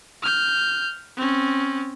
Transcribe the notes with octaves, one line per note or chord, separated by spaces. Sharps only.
F6 G6
C4 C#4